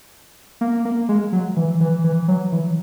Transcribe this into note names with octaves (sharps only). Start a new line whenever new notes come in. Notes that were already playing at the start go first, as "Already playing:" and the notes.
A#3
A#3
G#3
F#3
E3
E3
E3
F#3
E3